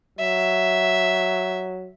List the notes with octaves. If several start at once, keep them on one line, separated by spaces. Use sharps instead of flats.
F#3 E5